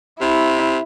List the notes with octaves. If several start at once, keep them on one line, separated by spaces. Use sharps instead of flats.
C3 E4